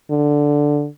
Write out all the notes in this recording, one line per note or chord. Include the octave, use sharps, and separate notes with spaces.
D3